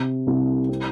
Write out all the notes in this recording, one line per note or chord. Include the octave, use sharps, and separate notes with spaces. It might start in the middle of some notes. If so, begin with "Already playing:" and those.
Already playing: C3
C2
C4